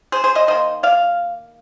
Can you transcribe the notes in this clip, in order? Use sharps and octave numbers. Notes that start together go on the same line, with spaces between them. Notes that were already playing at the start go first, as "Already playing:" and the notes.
G#4 C5
G#4 C5
C5 D#5
D#3 A#3 C5 D#5
D5 F5